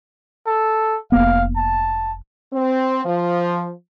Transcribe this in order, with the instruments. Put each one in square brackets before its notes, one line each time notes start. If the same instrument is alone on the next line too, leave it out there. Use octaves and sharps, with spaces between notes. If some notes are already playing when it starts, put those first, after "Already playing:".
[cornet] A4
[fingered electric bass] F1 A#3 B3 [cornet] F5
[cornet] A5
[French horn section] C4
F3